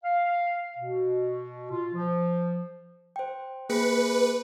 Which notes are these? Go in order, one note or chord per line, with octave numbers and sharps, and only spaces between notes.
F5
B2
F4
F3
C5 G5
A#3 G#4 B4 C#7